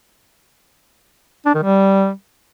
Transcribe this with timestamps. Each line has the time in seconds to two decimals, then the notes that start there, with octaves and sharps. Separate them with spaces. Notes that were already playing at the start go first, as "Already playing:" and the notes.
1.46 D4
1.54 D#3
1.63 G3